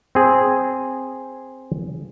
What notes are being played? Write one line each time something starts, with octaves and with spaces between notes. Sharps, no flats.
C4 G#4